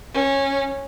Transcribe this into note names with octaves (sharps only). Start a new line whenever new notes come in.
C#4